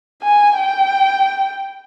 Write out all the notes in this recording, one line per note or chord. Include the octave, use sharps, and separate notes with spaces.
G#5
G5